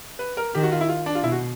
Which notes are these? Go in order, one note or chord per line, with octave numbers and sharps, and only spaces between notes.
B4
A#4
D#3 G4
F#4
F4
E4
F4
D4
F4
B2 E4
F#4